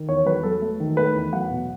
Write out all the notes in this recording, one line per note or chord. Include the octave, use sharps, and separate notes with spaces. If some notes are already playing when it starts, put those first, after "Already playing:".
Already playing: D#3
E2 C#5
F#3 B4
F#3 A4
A3
D#3
A3 B4
E2
F#3 F#5
B2